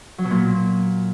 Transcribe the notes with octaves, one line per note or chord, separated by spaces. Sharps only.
F#3
B2
A#2